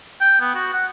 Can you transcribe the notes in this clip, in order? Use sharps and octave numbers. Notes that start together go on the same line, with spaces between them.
G5
B3
F#4
F#5